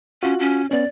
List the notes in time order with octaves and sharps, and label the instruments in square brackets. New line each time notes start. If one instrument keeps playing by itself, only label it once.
[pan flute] C#4 [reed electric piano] F4 F#4
[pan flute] C#4
[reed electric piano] B3 C#4 [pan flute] D5